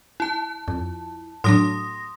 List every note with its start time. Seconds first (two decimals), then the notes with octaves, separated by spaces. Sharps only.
0.20 E4 A5
0.68 F2
1.44 A2 F#3 D4 C6 D#6 A#6